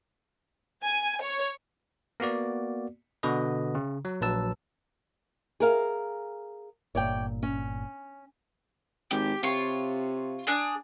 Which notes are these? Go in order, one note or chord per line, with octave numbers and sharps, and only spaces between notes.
G#5
C#5
A#3 B3 F#4 D5
B2 D3 F#4 B4 D#5
C#3
F#3
A#1 F#3 B4 A5 E6
G#4 A#4 F5
G1 A#2 C#5 D5 G5
C#4
G#1 G4
C3 F4 C#5
D4 G#4